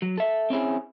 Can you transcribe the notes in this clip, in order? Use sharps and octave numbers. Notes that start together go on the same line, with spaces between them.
F#3
A4 E5
C4 C#4 E4 G#4